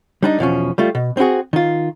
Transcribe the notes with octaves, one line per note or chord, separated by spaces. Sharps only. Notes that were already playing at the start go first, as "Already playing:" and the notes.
G3 D4 D#4
E2 B2 F3 C#4
G3 A3 F4
B2
C4 D#4 E4 F#4 G#4
D#3 F4